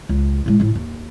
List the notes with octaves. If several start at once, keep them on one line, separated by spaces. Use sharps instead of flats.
C#2
A2 G#3
A2 F4
D#2